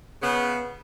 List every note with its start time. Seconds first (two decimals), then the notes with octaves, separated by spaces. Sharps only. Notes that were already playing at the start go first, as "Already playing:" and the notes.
0.22 C#3 B3